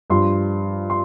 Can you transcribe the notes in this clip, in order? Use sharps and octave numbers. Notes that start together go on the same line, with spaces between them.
G2 F3 C6
C6